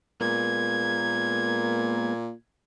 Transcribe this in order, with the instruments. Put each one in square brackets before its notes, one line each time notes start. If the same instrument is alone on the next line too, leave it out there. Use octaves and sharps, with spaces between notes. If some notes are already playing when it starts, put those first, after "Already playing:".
[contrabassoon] A#2 [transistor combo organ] G#3 A#3 B3 [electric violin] G#6